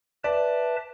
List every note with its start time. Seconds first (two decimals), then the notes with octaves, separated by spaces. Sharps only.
0.24 B4 D5 E5 A5